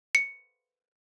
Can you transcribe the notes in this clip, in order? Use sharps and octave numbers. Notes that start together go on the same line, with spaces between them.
C#7